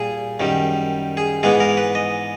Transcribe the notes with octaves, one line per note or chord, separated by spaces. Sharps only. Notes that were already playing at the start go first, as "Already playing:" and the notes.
Already playing: A#2 G3 G#4
F#2 D#3 G3
G#4
G#2 E3 G#3 B3 G#4
A#4
B4
D#5